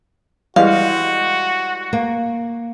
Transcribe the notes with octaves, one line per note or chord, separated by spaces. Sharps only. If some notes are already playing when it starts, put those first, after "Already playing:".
E3 G3 G#3 F#4 F5
A#3